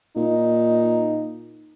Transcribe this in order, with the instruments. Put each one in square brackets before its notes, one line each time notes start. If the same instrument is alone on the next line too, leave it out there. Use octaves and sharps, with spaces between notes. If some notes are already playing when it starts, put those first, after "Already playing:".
[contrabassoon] A#2 [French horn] D#4